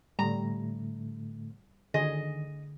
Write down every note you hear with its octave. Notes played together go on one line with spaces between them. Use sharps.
A2 D3 G3 A3 A#5
D3 D#3 G#4 D#5